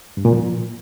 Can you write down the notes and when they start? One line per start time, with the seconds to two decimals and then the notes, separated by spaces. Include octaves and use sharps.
0.17 G2
0.25 A#2
0.33 F3